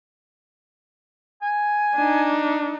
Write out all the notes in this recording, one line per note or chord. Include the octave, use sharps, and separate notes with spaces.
G#5
D4 D#4